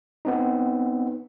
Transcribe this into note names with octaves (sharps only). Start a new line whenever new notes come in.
B3 C4 D#4